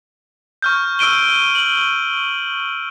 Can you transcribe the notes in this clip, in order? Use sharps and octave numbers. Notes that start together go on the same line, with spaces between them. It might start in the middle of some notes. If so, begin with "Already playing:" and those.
C#6 F6 G6
E6 F6 D7 D#7 G7
F#7